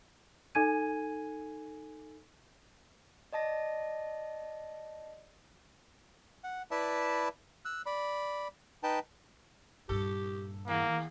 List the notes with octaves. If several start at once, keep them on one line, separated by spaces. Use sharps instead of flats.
D#4 A4 G#5 G#6 D#7
D5 D#5 A5 A#6
F#5
E4 B4 D5 E5 A5
E6 F#6
D5 B5
D#4 B4 G5 A5
G2 A#2 G4 A4
D#2 A#3 F5